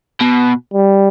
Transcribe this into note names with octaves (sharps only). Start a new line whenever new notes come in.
B2
G3